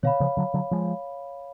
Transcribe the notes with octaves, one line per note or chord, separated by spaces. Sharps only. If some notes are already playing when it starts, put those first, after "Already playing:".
B2 D3 C#5 F5 B5
C#3 F3
D3 F#3
D3 F#3
F3 G#3